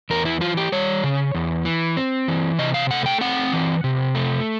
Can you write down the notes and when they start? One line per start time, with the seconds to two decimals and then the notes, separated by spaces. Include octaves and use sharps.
0.10 E2 A#4
0.25 E4
0.41 E3 F4
0.57 G4
0.72 G3 C#5
1.04 C#3
1.35 E2
1.65 E3
1.97 C4
2.28 E3
2.58 C3 D#5
2.74 F5
2.91 A3 F#5
3.06 G5
3.21 C4 F#5
3.53 E3
3.84 C3
4.15 A3